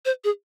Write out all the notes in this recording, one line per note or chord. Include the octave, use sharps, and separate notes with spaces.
C5
G#4